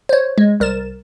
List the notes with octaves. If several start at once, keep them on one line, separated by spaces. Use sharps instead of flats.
C5 C#5
G#3
C2 A#4 A6 E7